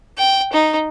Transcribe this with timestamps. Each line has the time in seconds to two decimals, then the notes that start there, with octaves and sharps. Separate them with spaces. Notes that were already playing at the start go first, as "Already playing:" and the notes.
0.18 G5
0.53 D#4